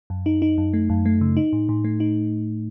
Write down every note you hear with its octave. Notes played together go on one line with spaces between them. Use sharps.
F#2
D#4
D#4
F#2
A3
F#2
A3
C#3
D#4
A2
A2
A3
D#4